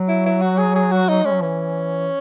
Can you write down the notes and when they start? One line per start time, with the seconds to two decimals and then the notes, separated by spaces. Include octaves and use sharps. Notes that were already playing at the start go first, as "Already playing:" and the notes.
Already playing: F#3
0.08 E4
0.26 E4
0.42 F#4
0.58 G#4
0.76 G#4
0.92 F#4
1.09 D#4
1.24 G#3 C#4
1.32 F#3
1.42 E3 C#4